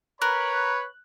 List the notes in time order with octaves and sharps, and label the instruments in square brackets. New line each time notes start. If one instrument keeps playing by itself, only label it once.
[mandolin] A#4 [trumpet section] B4 C#5 B5 [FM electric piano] F#6